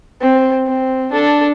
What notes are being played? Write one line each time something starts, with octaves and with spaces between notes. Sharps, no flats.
C4
C4
D4 A4